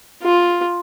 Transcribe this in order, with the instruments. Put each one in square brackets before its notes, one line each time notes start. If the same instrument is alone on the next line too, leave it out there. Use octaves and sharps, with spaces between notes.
[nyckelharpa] F4